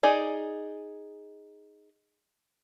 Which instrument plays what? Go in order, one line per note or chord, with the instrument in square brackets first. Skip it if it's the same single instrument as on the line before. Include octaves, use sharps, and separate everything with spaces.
[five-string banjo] D#4 G#4 D5